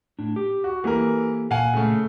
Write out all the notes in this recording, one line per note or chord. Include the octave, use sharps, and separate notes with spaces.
A2 D4
G4
F#4
E3 A#3 G4 A4 A#4
A#2 F5 F#5 G#5
C#3 A3